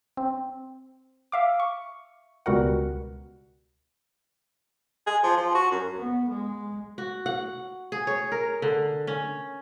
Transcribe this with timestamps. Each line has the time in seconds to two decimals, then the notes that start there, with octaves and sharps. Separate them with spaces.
0.17 C4
1.32 E5 F5 D6
1.60 C#6
2.46 C#2 B2 G3 F#4 A#4 F#5
5.07 G#4
5.24 F3
5.38 F3
5.55 F#4
5.71 F#2
5.97 B3
6.29 G#3
6.98 F#4
7.26 F#5
7.92 G#4
8.07 C#5
8.32 A#4
8.62 D3
9.07 C#4